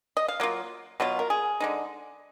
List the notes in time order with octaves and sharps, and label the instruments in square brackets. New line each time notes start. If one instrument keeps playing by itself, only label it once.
[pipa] D#5
F5
F#3 A#3 F4
B2 F#3 B3 F4
A#4
G#4
D3 G#3 D#4